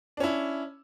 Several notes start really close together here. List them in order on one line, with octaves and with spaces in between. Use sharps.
D4 C#4 E4